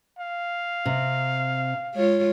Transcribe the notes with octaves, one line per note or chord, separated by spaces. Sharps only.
F5
C3
G#3 F4 C#5